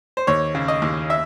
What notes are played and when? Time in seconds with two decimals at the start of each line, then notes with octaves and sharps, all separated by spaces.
0.17 C5
0.27 D#2 C#5
0.55 C#3
0.68 D#5
0.82 D#2
1.10 E5